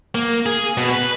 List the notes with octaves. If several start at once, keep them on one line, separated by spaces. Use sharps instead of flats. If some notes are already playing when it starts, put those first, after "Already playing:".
A#3
G#4
B2
B4